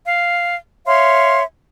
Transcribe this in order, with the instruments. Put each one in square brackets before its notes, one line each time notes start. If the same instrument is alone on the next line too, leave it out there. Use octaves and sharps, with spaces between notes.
[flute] F5
[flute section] C#5 E5 C6 [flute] F5